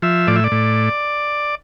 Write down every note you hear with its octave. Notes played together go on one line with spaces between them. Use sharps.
F3 E5
A2 D5
E5
D5
A2